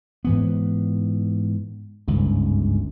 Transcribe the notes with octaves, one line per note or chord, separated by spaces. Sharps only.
G#2 E3 B3
G1 C#2 G#2